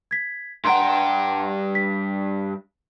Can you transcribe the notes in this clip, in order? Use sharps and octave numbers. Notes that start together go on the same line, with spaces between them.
G#6 B6
G2 F#5 G5 A#5 C6
B6